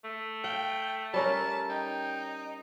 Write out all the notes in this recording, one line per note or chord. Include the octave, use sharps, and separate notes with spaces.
A3
F5 G5
G3 C#4 A#4 A5
D#4 G5